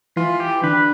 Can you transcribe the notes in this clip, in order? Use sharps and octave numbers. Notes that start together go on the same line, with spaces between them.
E3 F4
G4
D3 B4